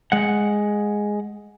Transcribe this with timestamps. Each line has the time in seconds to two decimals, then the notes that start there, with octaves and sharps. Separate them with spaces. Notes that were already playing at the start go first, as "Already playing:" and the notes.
0.12 G#3 F#5